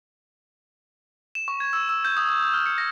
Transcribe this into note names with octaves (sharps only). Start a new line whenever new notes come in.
E7
C#6
G#6
E6
E6
G6
D#6
D#6
F6
C#7
A#6